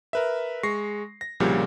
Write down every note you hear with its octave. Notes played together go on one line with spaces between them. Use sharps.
A#4 B4 E5
G#3 C#6 A#6 C7
A#6
C2 A#2 C#3 F3 G3